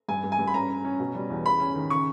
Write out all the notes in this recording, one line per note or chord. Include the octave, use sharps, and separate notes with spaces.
G2 G#5
G2
G#5
G2
B5
C#4 A#5
C#4
C#4
B2
G3
E2
E2 B5
C#4
D#3
C#3 C#6